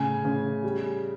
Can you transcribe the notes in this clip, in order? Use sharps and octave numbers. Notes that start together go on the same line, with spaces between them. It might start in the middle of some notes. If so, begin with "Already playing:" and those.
Already playing: A2 C#3 G#5
C#3
G3